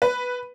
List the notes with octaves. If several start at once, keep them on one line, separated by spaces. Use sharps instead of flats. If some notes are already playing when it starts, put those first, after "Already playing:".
B4